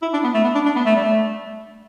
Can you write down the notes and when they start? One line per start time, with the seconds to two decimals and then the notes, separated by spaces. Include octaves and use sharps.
0.02 E4
0.13 D4
0.24 B3
0.34 A3
0.44 B3
0.55 D4
0.65 D4
0.76 B3
0.85 A3
0.95 G3
1.04 A3